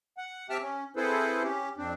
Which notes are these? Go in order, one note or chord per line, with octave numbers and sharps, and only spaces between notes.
F#5
C4 G4 E5 G5 A5 F6
C#4
C4 E4 G#4 A4 B4 C5
C#4 G4
F2 C4 D4